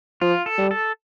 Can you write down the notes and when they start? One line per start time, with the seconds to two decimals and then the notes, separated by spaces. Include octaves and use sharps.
0.22 F3 F4
0.46 A4
0.58 G3
0.71 A4